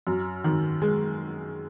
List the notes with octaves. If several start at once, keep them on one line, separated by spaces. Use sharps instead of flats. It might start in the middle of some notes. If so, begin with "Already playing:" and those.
F#2
D#3
G#3